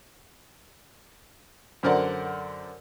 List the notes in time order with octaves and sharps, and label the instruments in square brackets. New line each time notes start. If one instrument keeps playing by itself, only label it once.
[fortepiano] F#2 D3 A#4 C5 D5 F#5